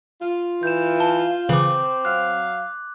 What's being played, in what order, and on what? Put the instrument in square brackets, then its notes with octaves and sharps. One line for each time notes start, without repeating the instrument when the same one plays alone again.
[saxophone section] F4
[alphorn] E3 [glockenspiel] G6 E7
[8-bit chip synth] A5 [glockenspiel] G7
[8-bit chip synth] C#3 E3 [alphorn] C4 [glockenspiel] D6 F#7
[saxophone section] F#3 F5 [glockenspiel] F#6